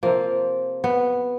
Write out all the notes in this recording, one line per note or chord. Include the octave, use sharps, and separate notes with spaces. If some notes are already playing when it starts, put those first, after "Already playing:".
C3 F3 A#3
B3